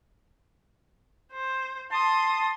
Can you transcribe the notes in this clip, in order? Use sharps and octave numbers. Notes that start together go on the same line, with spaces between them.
C5
A5 C6 D#6